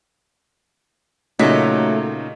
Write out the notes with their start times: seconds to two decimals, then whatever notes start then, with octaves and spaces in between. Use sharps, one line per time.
1.39 A#2 C#3 F#3 A3 D#4 B6